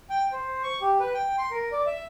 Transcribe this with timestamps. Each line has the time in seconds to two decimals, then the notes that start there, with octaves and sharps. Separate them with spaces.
0.10 G5
0.32 C5
0.63 C#6
0.81 G4
1.00 B4
1.14 G5
1.38 C6
1.51 A#4
1.72 D5
1.86 E5